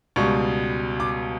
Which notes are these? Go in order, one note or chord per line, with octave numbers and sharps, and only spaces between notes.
C#2 B2 G3 C#6
D6